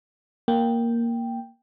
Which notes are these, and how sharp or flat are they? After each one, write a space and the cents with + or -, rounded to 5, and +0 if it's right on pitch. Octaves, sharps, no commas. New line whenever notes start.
A#3 +0 G5 +0